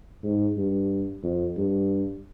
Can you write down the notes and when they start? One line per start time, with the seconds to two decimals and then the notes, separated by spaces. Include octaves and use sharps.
0.24 G#2
0.57 G2
1.23 F2
1.57 G2